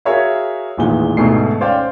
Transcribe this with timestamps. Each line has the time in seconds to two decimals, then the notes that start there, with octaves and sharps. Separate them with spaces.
0.05 F#4 G#4 A#4 C#5 E5 F5
0.78 A1 E2 A#2 D#3 G#3 G7
1.17 D2 G#2 B2 A3 C7
1.60 C#4 C5 D5 F5 G5